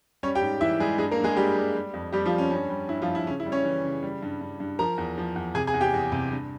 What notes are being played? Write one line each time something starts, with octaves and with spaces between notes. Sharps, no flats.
G3 C#4 C#5
G4 G5
G#2
E3 E4 E5
G3 G#3 G#4
G2 G#3 G#4
A#3 A#4
G2
G#3 G#4
G2 G3 G4
G3
G3
F2
F2 G3 G4
F3 F4
G3
C#4
G2 C#4
G3
G2 E4
F3 F4
G2
E4
C#3 C#4
E4
G3
C#4 C#5
E3
C#3
G3
G2
G2
G2
F3 A#4 A#5
E2
F3
E2
C3 G#4 G#5
G#4 G#5
E2
G4 G5
E2
C3
G2